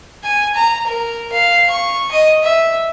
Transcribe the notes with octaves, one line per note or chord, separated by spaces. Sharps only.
G#5
A#5
A#4
F5
C#6
D#5
E5